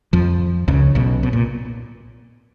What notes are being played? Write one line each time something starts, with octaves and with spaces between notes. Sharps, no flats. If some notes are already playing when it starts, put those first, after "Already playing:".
F2 F3
C#2 C#3
B1 B2
B2
A#2